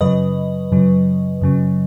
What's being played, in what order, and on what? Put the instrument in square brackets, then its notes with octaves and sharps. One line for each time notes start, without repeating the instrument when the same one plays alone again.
[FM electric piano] F#2 C#3 F#3 B4 D#5
F#2 C#3 F#3
F#2 C#3 F#3